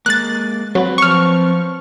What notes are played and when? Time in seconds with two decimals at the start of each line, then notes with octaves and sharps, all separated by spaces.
0.06 G#3 A#3 F#6 A6
0.75 F#3 C4 B4
0.98 F3 C#6 F6